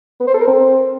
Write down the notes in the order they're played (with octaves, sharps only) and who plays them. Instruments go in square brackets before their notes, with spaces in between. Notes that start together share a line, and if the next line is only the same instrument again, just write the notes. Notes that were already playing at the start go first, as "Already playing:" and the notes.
[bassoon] B3
C5
A4
A#4
C4